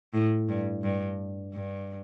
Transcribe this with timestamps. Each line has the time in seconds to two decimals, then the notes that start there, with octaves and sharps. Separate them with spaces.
0.14 A2
0.49 G2
0.83 G2
1.53 G2